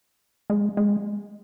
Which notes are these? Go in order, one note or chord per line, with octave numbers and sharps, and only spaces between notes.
G#3
G#3